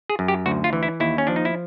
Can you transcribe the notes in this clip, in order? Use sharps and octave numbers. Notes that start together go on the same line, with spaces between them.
G#4
F#2
G4
D2 F#4
F4
E3
E4
D#2 E4
C#4
F3 D4
D#4
E4